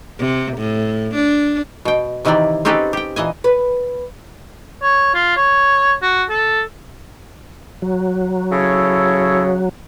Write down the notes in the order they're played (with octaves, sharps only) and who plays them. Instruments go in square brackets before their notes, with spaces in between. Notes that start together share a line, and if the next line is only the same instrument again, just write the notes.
[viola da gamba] C3
A2
D4
[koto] B2 G5
C3 D#3 E3 E4 D5 G5
C4 C#4 D#4 G4 A4 B4
G4 G5
A#2 E3 D#5 G#5
[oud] B4
[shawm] C#5
F4
C#5
F#4
A4
[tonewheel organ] F#3
[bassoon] C#3 [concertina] E4 A4 C#5